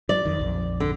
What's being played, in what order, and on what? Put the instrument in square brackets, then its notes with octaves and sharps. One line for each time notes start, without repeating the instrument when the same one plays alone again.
[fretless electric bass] F#3 [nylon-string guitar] D5
[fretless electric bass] F2 D#3
A#1 F2
[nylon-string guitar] D3